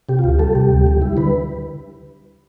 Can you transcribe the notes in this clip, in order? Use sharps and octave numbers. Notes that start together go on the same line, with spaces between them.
C3 G4
F4
D2
G4
G3 A4
C3 G4
D2
G3
G3 E4
D3 B4